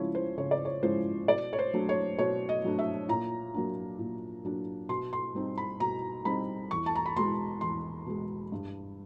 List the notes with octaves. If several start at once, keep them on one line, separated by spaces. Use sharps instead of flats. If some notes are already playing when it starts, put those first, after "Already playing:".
Already playing: C#3 F3 G#3 C#4 E4 C#5
C5
C#3 C#5
D5
C#5
F3 G#3 C#4 E4 C5
B2 D5
C#5
C5
F#3 A3 D4
C#5
B2 C#5
D#5
F#3 A3 D4
E5
A#2 A#5
F#3 A#3 D4
A#2
F#3 A#3 D4
B2 C6
C6
G3 C4 D#4
B5
B2 A#5
G3 C4 D#4 B5
E2 C#6
A5
A#5
B5
B2 G#3 C6
E2 C6
B2 G#3
G2